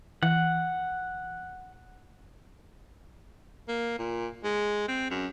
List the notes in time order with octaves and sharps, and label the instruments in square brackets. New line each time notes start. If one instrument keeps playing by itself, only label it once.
[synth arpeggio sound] E3 [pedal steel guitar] F#5
[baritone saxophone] A#3
A#2
G#3
C4
F#2